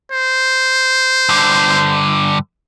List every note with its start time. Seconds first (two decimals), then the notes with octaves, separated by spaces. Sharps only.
0.11 C5
1.29 G2 D3